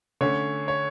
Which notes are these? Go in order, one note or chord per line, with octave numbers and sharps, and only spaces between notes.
D3 A3 C#4 C#5
C#5